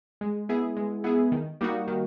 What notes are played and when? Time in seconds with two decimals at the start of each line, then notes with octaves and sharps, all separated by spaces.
0.21 G#3
0.49 B3 E4 G#4
0.77 G#3
1.04 B3 E4 G#4
1.32 D#3
1.61 G3 A#3 D#4 F#4
1.88 D#3